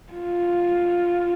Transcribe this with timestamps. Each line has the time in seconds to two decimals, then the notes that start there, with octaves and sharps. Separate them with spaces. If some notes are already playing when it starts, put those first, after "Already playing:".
0.12 F4